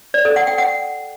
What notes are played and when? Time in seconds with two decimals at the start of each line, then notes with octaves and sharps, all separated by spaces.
0.14 D5
0.25 A4
0.36 F#5
0.47 G5
0.58 F#5